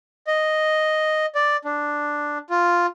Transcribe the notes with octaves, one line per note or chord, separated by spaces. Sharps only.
D#5
D5
D4
F4